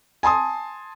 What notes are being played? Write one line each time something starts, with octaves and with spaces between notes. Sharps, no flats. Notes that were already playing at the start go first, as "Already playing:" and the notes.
G#5 A5 C6 D#6